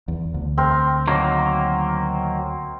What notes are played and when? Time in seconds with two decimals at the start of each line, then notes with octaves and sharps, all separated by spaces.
0.08 E2
0.34 D2
0.58 C4 A#4
1.08 D#3 F#3 A#3